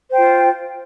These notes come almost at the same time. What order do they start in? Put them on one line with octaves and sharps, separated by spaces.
C5 G5 F4